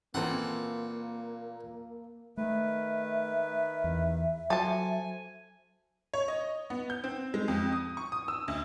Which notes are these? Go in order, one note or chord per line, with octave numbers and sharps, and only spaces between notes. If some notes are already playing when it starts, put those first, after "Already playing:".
A#2 E3 A#3 C4 A4 F#5
D#3 A3 B4 E5
E2
F#3 A4 C5 G#5 A5
C#5
D#5
B3
G6
C4
G#3
F2
D#6
C#6
D#6
E6
D2